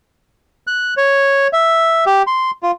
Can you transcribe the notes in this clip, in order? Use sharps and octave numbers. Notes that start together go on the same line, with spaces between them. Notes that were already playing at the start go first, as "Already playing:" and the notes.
F#6
C#5
E5
G4
C6
F4